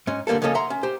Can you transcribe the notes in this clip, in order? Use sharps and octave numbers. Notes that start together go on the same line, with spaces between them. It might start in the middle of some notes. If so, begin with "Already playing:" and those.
G#2 C#4
D3 G3 A#3 B3 A4
C#3 F3 A#3 C#4 A4 D#5
E5 F#5 A#5 C6
C#4
G4 C5